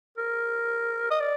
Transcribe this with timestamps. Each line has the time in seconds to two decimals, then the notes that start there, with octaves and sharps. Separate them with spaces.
0.18 A#4
1.11 D#5
1.20 D5